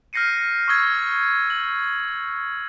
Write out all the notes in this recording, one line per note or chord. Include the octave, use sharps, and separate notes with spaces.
F6 G6 A#6 C7 C#7 D#7
C#6 D#6 E6 G#6
F#7